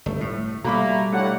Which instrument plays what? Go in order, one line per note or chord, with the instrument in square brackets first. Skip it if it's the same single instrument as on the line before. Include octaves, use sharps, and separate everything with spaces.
[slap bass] G1 [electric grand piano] A3
[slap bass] A2 [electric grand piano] A3
[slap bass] B2 G3 [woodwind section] A3 A#3 [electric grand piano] A#5 B5
[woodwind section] A2 F#5 [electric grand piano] A3 D4 G4